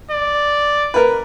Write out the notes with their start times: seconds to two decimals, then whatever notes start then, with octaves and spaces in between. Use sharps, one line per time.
0.11 D5
0.94 A#4 B4